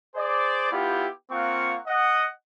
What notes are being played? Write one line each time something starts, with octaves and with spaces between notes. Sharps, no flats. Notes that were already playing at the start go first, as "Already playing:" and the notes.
G#4 C5 D5
B3 E4 F4 G4
A#3 C4 F4 F#5 C#6
D#5 F#5